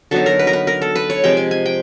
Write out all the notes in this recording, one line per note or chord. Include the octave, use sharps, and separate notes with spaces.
D3 F#3 B3 D#4 A4
A#4
B4
A#4
B4
A#4
A4
B4
C#5
C3 F3 G#3 G5
G#5
G#5
G5